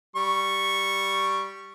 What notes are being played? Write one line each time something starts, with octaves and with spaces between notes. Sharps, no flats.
G3 C#6